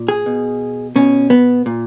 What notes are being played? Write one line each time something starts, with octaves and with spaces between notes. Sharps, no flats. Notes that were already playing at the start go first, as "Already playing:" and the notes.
Already playing: A#2
G#4
B2
B2 C#4
B3
A#2